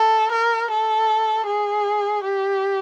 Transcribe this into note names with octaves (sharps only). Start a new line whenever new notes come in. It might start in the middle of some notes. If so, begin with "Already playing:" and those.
Already playing: A4
A#4
A4
G#4
G4